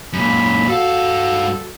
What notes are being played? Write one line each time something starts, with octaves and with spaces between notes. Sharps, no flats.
F#2 A#2 B5
G2 F#4 A4 F5